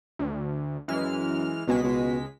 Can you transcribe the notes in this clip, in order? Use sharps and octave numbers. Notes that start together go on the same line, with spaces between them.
D2
F#2 E3 G#3 F6
C#2 B2 G#3 B6
B2